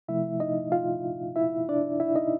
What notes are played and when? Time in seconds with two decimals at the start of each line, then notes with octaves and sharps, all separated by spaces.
0.08 C3 F3 A3 E4 E5
0.40 D#4 D#5
0.72 F4 F5
1.36 E4 E5
1.69 D4 D5
2.00 E4 E5
2.16 D#4 D#5